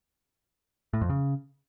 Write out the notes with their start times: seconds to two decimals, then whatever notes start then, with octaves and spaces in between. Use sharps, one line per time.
0.93 A2
1.01 F2
1.09 C#3